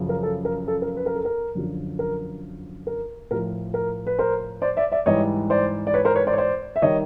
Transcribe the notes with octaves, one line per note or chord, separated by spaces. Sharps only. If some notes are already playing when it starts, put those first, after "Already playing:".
Already playing: F#2 C#3 F3
A#4
A4
A#4
A4
A#4
B4
A#4
A4
A#4
F#2 D3 F3
A#4
A#4
A2 F3 A#4
A#4
B4
A#4 C5
C5 D5
D5 E5
D5 E5
G#2 E3 G3 C#5 D#5
C5 D5
D5
B4 C#5
A#4 C5
B4 C#5
C5 D5
C#5
C5 D5
E5
D#3 G3 C#5 D#5